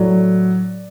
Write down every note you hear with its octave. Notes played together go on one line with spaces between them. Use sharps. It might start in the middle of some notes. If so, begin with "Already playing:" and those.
Already playing: A2 F#3 D5